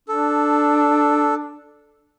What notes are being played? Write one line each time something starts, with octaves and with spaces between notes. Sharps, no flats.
D4 A4